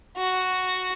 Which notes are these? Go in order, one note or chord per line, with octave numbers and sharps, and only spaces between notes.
F#4